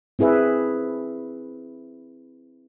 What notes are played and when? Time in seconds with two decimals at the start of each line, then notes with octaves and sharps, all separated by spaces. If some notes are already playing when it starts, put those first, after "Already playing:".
0.19 C4 E4 G#4 B4 E5